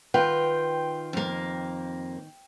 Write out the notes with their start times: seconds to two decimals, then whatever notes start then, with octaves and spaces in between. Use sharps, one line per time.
0.14 D#3 F4 B4 G5
1.13 F2 A#3